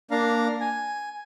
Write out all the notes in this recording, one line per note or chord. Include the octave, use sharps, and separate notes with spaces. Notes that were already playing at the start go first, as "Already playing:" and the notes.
A#3 D4 F5 A#5
G#5